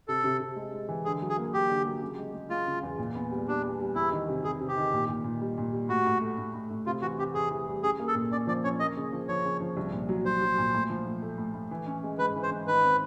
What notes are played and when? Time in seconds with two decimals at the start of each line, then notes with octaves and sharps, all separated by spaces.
0.08 C3 A4
0.24 C3
0.40 C3
0.56 G#3
0.73 G#3
0.89 E3
1.05 D3 G#4
1.22 F#3
1.29 G#4
1.38 A#3
1.54 A#3 G4
1.69 D3
1.86 F#3
2.02 C#3
2.18 G#3
2.34 G#3
2.50 G#3 F4
2.66 C#3
2.83 E2
2.98 A#2
3.15 B3
3.31 G3
3.47 G3 D4
3.63 B3
3.79 G3
3.95 E2 E4
4.12 D#3
4.28 C3
4.43 C3 G#4
4.60 C3
4.68 G4
4.77 D#3
4.93 A#2
5.09 A#2
5.24 A#2
5.41 G3
5.58 A#2
5.73 G3
5.89 A2 F#4
6.05 A2
6.22 A3
6.38 A2
6.54 A2
6.70 A2
6.86 C3 F4
7.02 E3 F#4
7.18 C3 G4
7.34 E2 G#4
7.51 E3
7.67 G3
7.83 C#4 G#4
8.00 A#3
8.08 A4
8.15 A#2
8.32 C#4 D5
8.47 F3 D5
8.64 C#4 C#5
8.79 A#3 D#5
8.96 C#3
9.13 F3
9.28 F3 C#5
9.45 C#3
9.60 F3
9.77 C2
9.93 A#2
10.09 F#3
10.25 F#3 C5
10.42 F#3
10.58 A#2
10.74 A2
10.90 F3
11.06 A2
11.22 A3
11.38 A2
11.54 A2
11.71 E3
11.86 C#4
12.03 G#3
12.19 G#2 B4
12.36 E3
12.43 C5
12.51 G#2
12.67 D#3 B4
12.84 C4